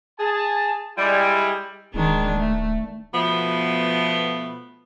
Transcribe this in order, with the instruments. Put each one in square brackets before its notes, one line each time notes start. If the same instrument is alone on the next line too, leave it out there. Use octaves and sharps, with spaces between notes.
[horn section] G#4 A5
G3 G#3 E4
[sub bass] D1 [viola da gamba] D#3 G#3 D4
[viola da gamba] A3
[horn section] B2 F3 A3 B3